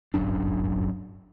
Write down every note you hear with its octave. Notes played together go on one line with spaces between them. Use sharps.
D1 G1 F#2 D4